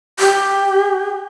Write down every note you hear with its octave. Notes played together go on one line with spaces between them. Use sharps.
G4